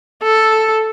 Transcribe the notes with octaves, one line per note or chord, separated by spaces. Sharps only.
A4